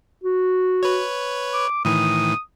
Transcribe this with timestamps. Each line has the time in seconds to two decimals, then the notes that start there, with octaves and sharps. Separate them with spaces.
0.24 F#4
0.83 B4 C#5
1.54 D6
1.85 A2 D#3 E3 D#6